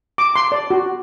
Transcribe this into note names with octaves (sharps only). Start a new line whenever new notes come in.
D6
C6
D5
F#4